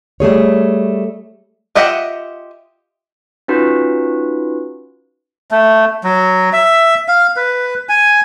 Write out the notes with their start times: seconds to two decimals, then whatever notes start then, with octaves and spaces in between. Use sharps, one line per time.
0.20 G3 A3 G#4 C#5
1.75 F4 G4 D#5 E5 F#5
3.48 C#4 D#4 F4 F#4 B4
5.51 A3
6.04 F#3
6.53 E5
7.08 F5
7.36 B4
7.89 G#5